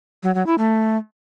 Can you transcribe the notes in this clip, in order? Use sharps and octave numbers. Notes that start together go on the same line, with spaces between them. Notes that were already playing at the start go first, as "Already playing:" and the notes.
F#3
F#3
E4
A3